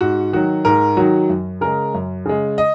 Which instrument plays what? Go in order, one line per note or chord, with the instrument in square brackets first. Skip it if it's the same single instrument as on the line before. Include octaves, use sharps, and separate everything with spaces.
[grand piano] G#2 F#4
D#3 F#3 F#4
G#2 A#4
D#3 F#3 F#4
F#2
C#3 G#3 A#4
F#2
C#3 G#3
D#5